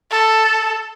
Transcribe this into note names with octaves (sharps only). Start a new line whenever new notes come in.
A4